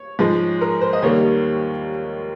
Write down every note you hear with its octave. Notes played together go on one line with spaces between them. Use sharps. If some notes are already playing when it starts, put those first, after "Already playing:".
Already playing: C#5
G#2 F3 G#3
A#4
C5
D#5
D#2 D#3 G3 A#3 C#5